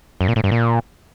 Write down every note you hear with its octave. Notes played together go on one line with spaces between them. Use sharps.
F#2
A#2
A2
G2
A#2